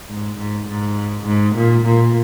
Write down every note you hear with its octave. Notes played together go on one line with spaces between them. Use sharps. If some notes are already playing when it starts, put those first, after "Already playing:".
G#2
G#2
G#2
G#2
A#2
A#2